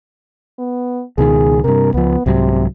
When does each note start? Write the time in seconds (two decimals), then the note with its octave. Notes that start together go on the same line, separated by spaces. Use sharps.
0.59 B3
1.18 C#2 B2 D#3 G#4
1.64 G2 C3 A#4
1.94 C#2 F3 B3
2.26 C2 G#2 C3 F#3